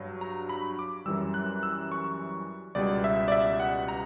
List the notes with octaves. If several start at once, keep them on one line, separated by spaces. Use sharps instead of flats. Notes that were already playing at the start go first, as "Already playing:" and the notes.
Already playing: G2 F#3
A#5
B5
D6
F#2 E3 G3 E6
F#6
E6
C#6
C#2 B2 G3 D5
E5
D5
E5
F#5
A#5